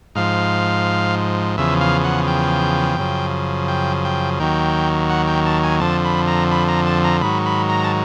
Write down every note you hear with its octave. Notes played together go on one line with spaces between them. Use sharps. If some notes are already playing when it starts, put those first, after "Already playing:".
G#2 F3 F5
E2 C#3 F3 E5
F5
F#5
G5
F#2 C#3 F3
G5
G5
D#2 D#3 F#3 G5
F#5
G5
A5
G#5
F2 D3 F3 A5
B5
A#5
B5
A#5
A5
A#5
G#2 D#3 F#3 B5
B5
A#5
A5